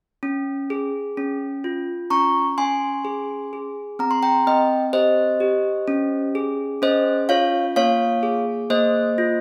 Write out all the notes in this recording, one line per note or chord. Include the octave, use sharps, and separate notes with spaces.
C#4
G#4
C#4
F4
C#4 A#5 C#6
C#4 G#5 C6
G#4
G#4
C4 A#5
C6
G5 A#5
C4 D#5 G5
G4 C5 D#5
G4
C#4
G#4
C#4 C5 D#5
F4 C#5 F5
A#3 C#5 F5
G#4
A#3 C5 D#5
F4